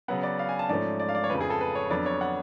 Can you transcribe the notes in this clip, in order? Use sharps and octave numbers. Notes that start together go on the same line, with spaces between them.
C#3 F#3 B3 F#5
D5
F5
G#5
A5
G#2 F3 A3 C#4 D5
D5
F5
D5
C#5
F2 C#3 F3 A3 B4
G#4
A4
B4
C#5
F2 D3 F#3 B3 D5
C#5
F#5